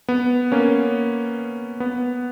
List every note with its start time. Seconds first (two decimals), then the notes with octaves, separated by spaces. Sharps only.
0.09 B3
0.52 A#3 C#4
1.80 B3